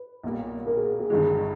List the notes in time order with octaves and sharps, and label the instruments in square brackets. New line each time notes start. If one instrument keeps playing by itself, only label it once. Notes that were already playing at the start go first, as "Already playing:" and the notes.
Already playing: [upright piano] B4
[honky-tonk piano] B1 A#2 G3 A#3
[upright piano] A#4
G#4
G#4
[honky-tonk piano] G1 G2 D#3 G#3 [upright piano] G#4